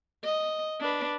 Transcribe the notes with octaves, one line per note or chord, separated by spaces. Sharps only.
D#5
D4 B4